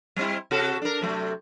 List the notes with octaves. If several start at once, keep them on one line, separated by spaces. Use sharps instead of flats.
G3 C4 E4
C3 F#4 A4
D4 A#4
C3 F#3 A3